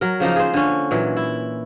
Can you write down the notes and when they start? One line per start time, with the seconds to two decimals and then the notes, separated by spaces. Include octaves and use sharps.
0.01 F#3 A#4
0.20 C#3 F3 A#3 D#4
0.36 G#4 C5
0.54 D3 C#4
0.91 A#2 E3 F#3
1.17 E4